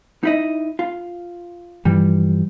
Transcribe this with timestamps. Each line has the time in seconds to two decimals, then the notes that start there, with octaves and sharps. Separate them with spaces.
0.23 D#4 E4 D#5
0.79 F4
1.85 G2 E3 F3 G3